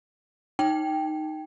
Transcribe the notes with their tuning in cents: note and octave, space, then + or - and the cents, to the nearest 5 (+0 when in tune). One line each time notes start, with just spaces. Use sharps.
D#4 +0 G5 +0